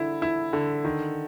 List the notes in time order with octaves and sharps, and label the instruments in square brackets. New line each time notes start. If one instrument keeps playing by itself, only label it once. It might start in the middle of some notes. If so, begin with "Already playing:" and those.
Already playing: [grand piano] D3 E4
E4
D3
D#3